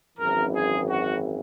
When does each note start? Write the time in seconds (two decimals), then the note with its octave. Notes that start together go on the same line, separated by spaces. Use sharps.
0.18 G#1 F#2 E3 A#4
0.54 G#4
0.90 F#4